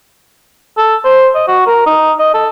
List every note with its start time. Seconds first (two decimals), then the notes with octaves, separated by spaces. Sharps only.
0.78 A4
1.04 C5
1.35 D#5
1.48 F#4
1.67 A#4
1.86 D#4
2.19 D#5
2.34 A4